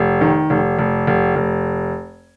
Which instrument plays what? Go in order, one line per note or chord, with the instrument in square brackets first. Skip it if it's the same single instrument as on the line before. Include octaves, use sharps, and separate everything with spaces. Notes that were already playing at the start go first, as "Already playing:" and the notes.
Already playing: [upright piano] F1
D#3
F1
F1
F1
F1